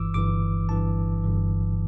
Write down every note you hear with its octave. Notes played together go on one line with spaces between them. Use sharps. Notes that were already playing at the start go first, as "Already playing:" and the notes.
Already playing: G1 G2 E3 D6 E6
G1 G2 E3 D6
G1 G2 E3 A5
G1 G2 E3